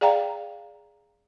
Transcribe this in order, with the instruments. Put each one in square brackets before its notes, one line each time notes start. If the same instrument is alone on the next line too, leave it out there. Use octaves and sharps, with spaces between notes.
[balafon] G#4 D5 F5 G5 A#5